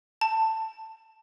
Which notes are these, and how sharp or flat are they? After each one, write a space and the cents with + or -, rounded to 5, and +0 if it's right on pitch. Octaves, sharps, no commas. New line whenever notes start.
A5 +15